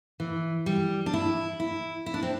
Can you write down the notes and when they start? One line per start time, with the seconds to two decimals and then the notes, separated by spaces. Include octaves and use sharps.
0.20 E3
0.66 G3
1.06 D4
1.13 E4
1.60 E4
2.06 E4
2.14 D4
2.23 C4